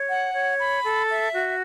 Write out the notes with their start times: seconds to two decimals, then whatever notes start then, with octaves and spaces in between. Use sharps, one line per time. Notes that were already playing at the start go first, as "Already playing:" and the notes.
Already playing: C#5
0.09 F#5
0.34 C#5
0.58 B5
0.84 A4
1.08 E5
1.33 F#4